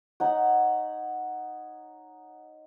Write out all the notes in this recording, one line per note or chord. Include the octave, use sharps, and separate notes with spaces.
D#4 C#5 F#5